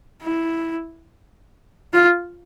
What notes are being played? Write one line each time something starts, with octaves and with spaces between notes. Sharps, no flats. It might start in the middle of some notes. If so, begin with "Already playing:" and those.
E4
F4